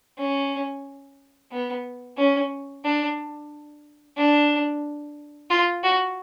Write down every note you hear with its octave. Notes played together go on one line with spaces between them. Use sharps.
C#4
B3
C#4
D4
D4
F4
F#4